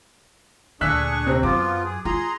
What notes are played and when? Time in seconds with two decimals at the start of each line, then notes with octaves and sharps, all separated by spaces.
0.81 D2 A#2 D4 G#4 C#6 E6 F#6 B6
1.26 C3 C4
1.43 F#2 F3 B3 F4 D6
1.84 G#4
2.05 F4 G#4 A#5 C6